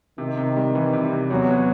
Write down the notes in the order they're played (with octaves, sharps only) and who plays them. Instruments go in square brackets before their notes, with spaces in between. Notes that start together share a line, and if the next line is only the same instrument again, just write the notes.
[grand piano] C3 [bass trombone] D#3
[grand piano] C3
G3
E3
C3
C3
[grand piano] E2 [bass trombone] F#3
[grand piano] B3